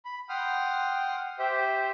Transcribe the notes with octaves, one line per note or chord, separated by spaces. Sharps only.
B5
F#5 G5 C6 D#6 F6
G4 C5 E5 G5